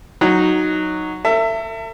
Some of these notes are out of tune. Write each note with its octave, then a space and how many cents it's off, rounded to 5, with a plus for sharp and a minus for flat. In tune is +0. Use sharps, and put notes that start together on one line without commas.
F#3 +0 D#4 +0
A4 +45 E5 +20